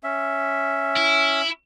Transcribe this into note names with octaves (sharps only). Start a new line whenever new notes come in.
C#4 E5
E4